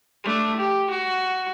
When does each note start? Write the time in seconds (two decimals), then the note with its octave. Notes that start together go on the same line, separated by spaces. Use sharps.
0.24 A3 D4
0.57 G4
0.90 F#4